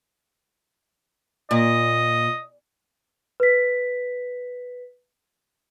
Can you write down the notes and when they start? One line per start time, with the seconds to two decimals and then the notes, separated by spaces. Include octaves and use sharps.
1.51 A#2 D#5
3.40 B4 B6